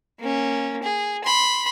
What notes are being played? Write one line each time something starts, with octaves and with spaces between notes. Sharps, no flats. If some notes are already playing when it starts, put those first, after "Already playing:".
A#3 C#4
G#4
B5 C6